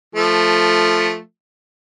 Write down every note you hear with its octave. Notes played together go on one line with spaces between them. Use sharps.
F3 A3